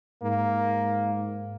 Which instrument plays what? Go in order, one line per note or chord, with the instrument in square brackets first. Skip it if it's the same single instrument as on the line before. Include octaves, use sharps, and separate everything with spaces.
[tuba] G#2 [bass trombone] A#3